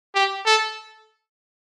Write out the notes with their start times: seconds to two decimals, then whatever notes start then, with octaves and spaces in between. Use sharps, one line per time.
0.15 G4
0.46 A4